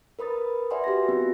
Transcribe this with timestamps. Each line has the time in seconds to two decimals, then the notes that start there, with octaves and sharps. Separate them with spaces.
0.19 A#4 B4 B5 D#6 A6
0.71 B4 D5 E5 F#5 G#5 C6
0.84 F#4 G4 D5 A#6
1.09 B3 C4 F4 F#4